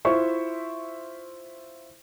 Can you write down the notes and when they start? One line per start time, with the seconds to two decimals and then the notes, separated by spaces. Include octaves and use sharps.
0.05 E4 F4 C5 E5 C#6